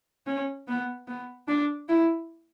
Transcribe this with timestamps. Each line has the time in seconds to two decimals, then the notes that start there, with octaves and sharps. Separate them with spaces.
0.26 C#4
0.68 B3
1.07 B3
1.48 D4
1.88 E4